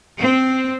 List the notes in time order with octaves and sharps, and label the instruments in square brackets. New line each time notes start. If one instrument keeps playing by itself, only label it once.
[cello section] C4